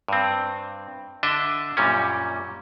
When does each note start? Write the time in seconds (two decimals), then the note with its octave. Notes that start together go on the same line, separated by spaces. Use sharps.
0.08 G2 C4
1.23 D3 D4 D#5 E5
1.77 F#2 A#2 G3 C#4